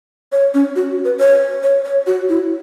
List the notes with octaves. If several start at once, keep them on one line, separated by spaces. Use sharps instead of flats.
C#5
C#4
F#4
B4
C#5
C#5
C#5
F#4
E4